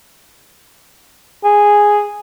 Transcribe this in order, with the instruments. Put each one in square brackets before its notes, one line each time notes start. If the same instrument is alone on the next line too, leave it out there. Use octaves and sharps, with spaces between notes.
[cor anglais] G#4